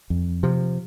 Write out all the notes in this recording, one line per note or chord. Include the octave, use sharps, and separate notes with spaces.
F2
C3 F3